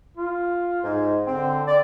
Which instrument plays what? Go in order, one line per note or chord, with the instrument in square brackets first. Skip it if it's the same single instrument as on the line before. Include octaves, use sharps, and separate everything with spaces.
[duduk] F4
[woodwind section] G#2
[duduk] D3 [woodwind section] C4
[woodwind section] D5